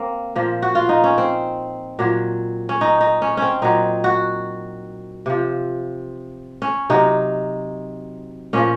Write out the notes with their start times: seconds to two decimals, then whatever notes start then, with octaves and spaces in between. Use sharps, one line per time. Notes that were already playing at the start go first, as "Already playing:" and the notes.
Already playing: A#3 C4
0.36 A#2 F3
0.62 F#4
0.75 F4
0.89 D#4
1.04 C#4
1.18 C4
1.99 A#2 F#3
2.69 C#4
2.81 D#4
3.01 D#4
3.22 C#4
3.37 C4 C#4
3.62 A#2 F#3 D#4
4.04 F#4
5.26 C3 F3
6.62 C#4
6.90 C3 F#3 D#4
8.53 A#2 F3 C#4